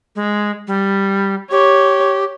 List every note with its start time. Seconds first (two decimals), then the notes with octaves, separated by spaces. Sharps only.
0.16 G#3
0.67 G3
1.51 G4 C#5